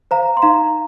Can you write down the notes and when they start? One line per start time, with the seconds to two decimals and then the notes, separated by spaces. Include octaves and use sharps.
0.11 C5 F5 A#5
0.37 C6
0.42 D#4 F5 A#5